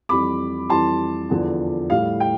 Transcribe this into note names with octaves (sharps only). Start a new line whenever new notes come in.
F2 E3 G3 B5 D6
F2 E3 G3 A5 C6
E2 D3 F3
A2 G3 F5
G5